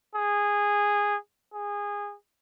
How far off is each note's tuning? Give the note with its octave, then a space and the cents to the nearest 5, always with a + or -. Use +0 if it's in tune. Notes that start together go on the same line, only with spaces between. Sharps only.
G#4 -15
G#4 -20